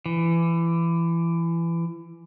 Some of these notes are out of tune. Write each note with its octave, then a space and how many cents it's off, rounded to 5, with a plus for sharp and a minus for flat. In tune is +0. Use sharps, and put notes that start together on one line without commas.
E3 +25